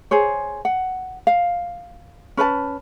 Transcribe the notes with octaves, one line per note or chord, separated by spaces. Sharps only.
G#4 C5 C#5
F#5
F5
C#4 B4 C5 A5